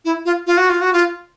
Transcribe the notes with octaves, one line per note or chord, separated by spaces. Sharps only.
E4
F4
F4
F#4
F4
F#4
F4